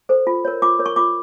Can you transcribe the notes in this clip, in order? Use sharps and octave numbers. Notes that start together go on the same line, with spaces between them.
A4 C5
F4
A#4 C#5
F4 D6
A#4 C#5
C#6
F4 D6